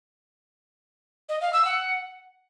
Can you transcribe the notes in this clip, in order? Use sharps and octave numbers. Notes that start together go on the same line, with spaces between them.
D#5
F5
E6
F#5